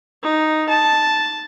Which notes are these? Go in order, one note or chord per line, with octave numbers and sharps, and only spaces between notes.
D#4
A5